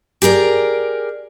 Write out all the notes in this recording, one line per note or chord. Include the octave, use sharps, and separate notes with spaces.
G4 G#4 A#4 D5